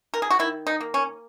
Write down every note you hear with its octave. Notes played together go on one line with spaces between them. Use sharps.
A#4
G#4
F#4
D#3 E4
D#4
A#3
C#4